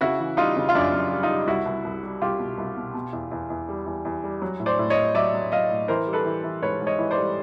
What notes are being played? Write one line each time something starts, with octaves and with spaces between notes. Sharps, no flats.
C#3 E4 F#4
E3
G3 D#4 F4
C#3
F4
F#2 D4 E4
F#2
G3
D#4 F4
G3
C2 E4 F#4
C2
C2
G3
C2 F4 G4
B2
C2
B2
B2
E2
E2
E2
G3
E2
E2
G3
F#3
A2
C5 D5
A2
C#5 D#5
A2
F#3 D5 E5
F#3
F#3 D#5 F5
A2
E3 A#4 C5
G3
A4 B4
E3
E3
G#2 B4 C#5
G#2
C#5 D#5
E3
C5 D5
G3